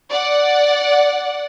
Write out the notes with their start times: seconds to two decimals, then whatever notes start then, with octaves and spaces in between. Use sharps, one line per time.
0.10 D5 F#5